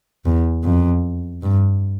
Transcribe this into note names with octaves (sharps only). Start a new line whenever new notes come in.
E2
F2
G2